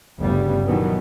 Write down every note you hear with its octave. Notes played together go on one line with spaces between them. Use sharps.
G1 D2 G2 C#3 G3 B3
B2 D#3 E3 F#3 B3